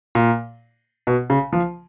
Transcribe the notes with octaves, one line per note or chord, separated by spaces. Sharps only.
A#2
B2
C#3
F3